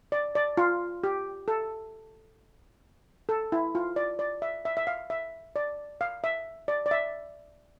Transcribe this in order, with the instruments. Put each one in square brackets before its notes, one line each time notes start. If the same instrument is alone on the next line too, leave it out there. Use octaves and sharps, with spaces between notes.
[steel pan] D5
D5
F4
G4
A4
A4
E4
F4
D5
D5
E5
E5
E5
F5
E5
D5
F5
E5
D5
D5
E5